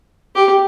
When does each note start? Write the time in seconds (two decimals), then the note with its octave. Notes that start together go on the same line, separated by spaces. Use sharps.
0.35 G4